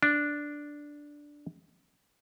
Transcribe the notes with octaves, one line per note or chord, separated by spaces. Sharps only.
D4